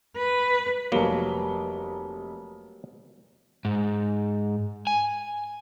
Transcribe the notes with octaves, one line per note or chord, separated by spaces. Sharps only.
B4
F1 F#3 G3 A#3 B3 G7
G#2
G#5